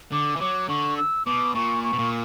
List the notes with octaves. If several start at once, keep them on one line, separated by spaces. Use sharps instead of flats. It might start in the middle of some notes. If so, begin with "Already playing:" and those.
D3 D6
E3
F#3 D6
D3 C#6
E6
B2 D6
A#2 C#6
C#6
B2
A#2